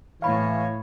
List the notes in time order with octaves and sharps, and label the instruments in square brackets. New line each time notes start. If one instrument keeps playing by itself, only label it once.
[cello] A2 C#5 [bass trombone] E3 [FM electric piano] F5 [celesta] B5 C#6